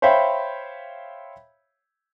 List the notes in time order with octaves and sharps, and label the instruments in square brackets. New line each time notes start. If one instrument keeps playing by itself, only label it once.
[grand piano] C5 C#5 E5 F5 G5 B5